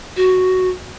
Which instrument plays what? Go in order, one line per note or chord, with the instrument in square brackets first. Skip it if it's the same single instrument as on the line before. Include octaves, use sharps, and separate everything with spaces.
[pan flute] F#4